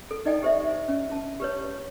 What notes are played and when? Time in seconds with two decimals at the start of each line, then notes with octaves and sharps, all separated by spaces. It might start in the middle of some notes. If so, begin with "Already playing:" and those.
0.11 A4
0.25 D#4 D5 D#5 G5 G#5
0.43 G4 C5 E5
0.88 C#4
1.12 A5
1.40 G4 B4 C#5